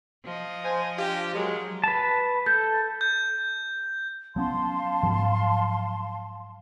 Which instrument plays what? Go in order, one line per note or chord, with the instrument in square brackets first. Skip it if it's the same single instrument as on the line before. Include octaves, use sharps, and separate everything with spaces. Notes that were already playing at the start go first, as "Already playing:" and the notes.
[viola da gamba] F3 D#5
[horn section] C5 G#5
D4 F4 G4
[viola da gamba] F#3 [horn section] G#3 A#4
[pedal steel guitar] B4 A5
[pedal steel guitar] A4 [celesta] G6
[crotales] G6
[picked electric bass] F#3 B3 C#4 [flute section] F5 A5 C6
[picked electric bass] G#2 F3 F#3